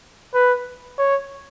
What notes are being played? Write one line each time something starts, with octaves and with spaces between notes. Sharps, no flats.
B4
C#5